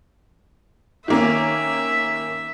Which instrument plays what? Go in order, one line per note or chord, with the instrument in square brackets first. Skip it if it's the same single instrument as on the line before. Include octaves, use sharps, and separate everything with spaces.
[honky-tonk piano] D#3 A#3 C#4 [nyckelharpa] E5